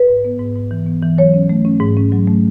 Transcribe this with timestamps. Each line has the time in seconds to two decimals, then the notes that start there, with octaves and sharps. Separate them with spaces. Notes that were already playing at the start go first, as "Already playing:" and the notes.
Already playing: B4
0.09 G#2
0.25 B3
0.40 G#2
0.55 G#2
0.71 E3
0.86 B3
1.02 E3
1.18 F#3 C#5
1.34 C#4
1.49 A3
1.65 C#4
1.80 G#2
1.97 C#4
2.12 F#3
2.28 A3